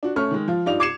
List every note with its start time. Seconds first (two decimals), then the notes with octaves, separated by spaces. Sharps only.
0.03 D4 F#4
0.16 A3 C#4 C#6 F6
0.31 D#3 G#3
0.48 F3 F4
0.66 G2 D#4 F4 D5 F7
0.80 D6 G#6 C7 C#7 E7